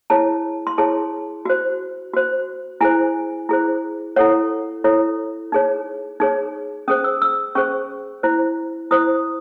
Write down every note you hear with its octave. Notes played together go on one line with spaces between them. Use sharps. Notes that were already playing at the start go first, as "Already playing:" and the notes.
E4 G#4 C#5 A5
C6
E4 G#4 C#5 A5
F#4 C5
F#4 C5
E4 G#4 C5 G#5
E4 G#4 C5
E4 A4 C#5 F#5
E4 A4 C#5
D#4 G#4 C#5
D#4 G#4 C#5
C#4 G#4 C5 D#6
E6
E6
C#4 G#4 C5 C#6
E4 C5
E4 C5 D#6